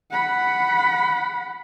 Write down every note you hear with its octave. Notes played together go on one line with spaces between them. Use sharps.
F#5 B5